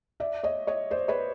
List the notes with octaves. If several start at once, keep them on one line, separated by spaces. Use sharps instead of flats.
D5 E5
C#5 D#5
C#5 D#5
C5 D5
B4 C#5